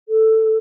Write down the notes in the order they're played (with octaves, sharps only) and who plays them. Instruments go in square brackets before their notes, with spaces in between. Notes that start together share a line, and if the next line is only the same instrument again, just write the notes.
[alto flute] A4